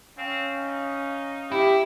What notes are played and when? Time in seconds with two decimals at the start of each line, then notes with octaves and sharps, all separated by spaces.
0.18 C4 C#4 F5
0.59 D#4
1.52 E4 G4